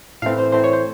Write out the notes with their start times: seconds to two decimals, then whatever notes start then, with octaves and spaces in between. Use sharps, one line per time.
0.22 A2 E3 A3 C4 F5
0.38 C5
0.52 A2 E3 A3 C4 C5
0.64 C#5
0.73 C5